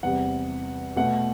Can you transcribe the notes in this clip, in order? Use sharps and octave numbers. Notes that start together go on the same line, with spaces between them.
E2 C3 G3 F#5
B2 A3 F#5